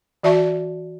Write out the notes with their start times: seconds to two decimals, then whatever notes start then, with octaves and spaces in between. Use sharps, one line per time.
0.23 E3 F#4 D5 E5 A5 C#6